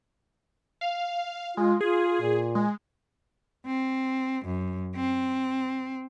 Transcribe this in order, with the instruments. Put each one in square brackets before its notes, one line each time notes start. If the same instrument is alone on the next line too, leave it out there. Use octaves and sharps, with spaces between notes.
[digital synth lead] F5
[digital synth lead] G#3 [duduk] F4
[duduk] F4 [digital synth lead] G#4
[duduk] A#2
[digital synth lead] G#3
[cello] C4
F#2
C4